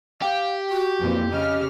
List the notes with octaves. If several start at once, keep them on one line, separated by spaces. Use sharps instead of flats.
G4 F5
F#4
F2 A#2 E3
C#3 D#5 F6